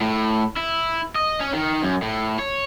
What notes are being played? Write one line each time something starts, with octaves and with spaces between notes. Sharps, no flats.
A2
E4
D#5
C#4
D#3
F#2
A2
C#5